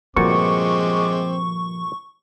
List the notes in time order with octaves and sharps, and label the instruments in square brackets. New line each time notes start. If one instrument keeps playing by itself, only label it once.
[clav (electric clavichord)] G1 A#2 F#4 [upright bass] F3 [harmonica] G#3 C4 D6 [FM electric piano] C#6